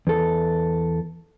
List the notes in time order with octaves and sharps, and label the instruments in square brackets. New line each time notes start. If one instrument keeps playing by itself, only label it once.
[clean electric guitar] E2 A4